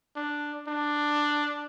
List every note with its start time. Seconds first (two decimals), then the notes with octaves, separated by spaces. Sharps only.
0.16 D4
0.68 D4